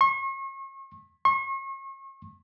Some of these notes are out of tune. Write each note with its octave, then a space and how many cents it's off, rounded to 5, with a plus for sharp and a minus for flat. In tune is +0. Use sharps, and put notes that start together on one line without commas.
C#6 -40
C#6 -40